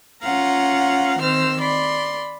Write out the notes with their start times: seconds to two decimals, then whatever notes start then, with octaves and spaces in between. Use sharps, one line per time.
0.23 C#4 F4 F5 F#5 A#5
1.19 D#3 C4 C5 E6 F6
1.61 D5 B5 C6